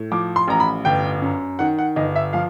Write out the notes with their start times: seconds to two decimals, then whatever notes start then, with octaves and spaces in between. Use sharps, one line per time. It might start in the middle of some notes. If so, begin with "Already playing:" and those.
Already playing: A2
0.12 F3 D6
0.36 C6
0.48 A1 A#5
0.60 B5
0.85 G1 G5
1.22 F#2
1.59 D#3 F#5
1.79 F#5
1.96 G1 D#5
2.16 E5
2.33 F3 F5